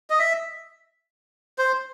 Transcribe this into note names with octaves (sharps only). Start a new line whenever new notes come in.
D#5
E5
C5